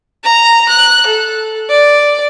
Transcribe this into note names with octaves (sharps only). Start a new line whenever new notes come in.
A#5
F#6
A4
D5